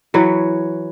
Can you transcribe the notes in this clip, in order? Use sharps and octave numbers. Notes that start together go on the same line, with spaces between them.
E3 F#3 B4 C#5